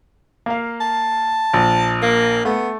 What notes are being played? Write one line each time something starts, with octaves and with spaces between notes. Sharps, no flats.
A#3 F5
A5
A#1
A#3
A3 B3